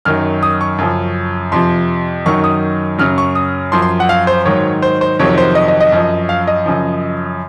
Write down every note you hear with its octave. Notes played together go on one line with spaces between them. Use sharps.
F#2 D#3 F#3 F6
D#6
C#6
F#2 C#3 F3
F2 C3 F3 C6
F#2 D#3 F#3 C#6
D#6
F#2 C#3 F#3 F6
C#6
D#6
F#2 F3 C6
C6
F#5
F5
C5
G#2 D#3 F#3 C#5
C5
C5
F2 C3 D#3 F#3 C#5
C5
D#5
D#5
D#5
F#2 F3
F5
D#5
F#2 C#3 F3